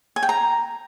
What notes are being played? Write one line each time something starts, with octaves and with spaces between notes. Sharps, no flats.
G#5
G5
A#5